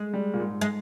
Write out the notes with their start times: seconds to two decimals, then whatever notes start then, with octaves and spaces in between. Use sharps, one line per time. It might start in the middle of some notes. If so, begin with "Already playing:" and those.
Already playing: G#3
0.13 G3
0.34 A#2
0.40 G#2
0.61 G#3